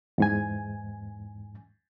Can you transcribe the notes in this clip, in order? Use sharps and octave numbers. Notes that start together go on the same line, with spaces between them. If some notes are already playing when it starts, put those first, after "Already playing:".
E2 G#2 G#5